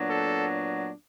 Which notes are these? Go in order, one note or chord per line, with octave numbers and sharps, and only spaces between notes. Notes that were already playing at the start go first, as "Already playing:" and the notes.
Already playing: A#2 F#3 B3 D4
A4